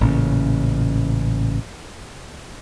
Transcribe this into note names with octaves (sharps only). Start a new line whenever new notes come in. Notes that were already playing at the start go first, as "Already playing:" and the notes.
A1 A#2 C#3